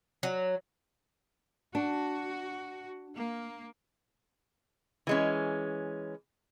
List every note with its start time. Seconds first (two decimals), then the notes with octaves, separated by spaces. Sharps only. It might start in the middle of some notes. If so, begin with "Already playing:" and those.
0.23 F#3
1.75 D4 F#4
3.14 A#3
5.07 E3 G#3 C#4